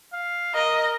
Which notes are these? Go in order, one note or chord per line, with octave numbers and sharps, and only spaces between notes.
F5
A#4 D#5